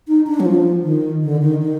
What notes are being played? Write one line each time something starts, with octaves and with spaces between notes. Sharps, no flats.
D#4
D4
F#3
F3
D#3
D3
D#3
D#3